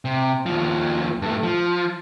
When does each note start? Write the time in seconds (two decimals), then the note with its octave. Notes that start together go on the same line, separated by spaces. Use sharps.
0.05 C3
0.46 D#2 F3
1.22 G2 A3
1.43 F3